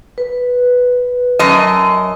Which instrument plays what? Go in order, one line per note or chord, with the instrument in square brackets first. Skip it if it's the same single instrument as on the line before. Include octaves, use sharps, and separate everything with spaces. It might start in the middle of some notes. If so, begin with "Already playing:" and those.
[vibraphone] B4
[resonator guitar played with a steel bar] F#2 D#5 [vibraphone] A5